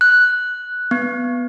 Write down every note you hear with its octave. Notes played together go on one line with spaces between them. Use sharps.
F#6
B3